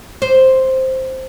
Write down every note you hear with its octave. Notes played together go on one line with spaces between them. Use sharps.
C5